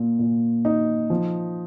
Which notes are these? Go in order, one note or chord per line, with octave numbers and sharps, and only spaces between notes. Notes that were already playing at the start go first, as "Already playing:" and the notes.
Already playing: A#2
A#2
D#4
F3